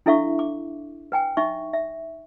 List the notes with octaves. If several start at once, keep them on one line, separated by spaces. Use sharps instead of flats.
D4 E4 A4 E5 F5 C#6
D6
B4 G5 G#5
D#4 E5 C#6
E5